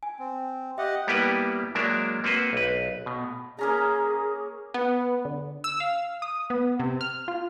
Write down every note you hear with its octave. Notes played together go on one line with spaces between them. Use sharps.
G#5
C4
G4 D#5 E5 F#5
G3 A#3 B3 E4 G4 B4
F#3 G#3 A#3 D4 A#4 E5
A#3 C4 F#4 B4 C5
B1 B4
B2
A#3 C#4 G#4 A#5
B3
D3
E6
F5
D#6
B3
C3
F6
F4